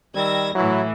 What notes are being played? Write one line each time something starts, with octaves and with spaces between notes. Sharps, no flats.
D#3 G3 E6 G#6 A#6
A2 E3 F#3 E4